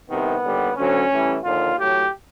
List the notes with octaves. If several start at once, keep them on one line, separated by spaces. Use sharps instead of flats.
C2 C3 D#3 B3
D#2 D3 G3
D2 D3 F#3 C#4
A2 E3 G3
D#2 D3 F3 F4
A2 F#3 G4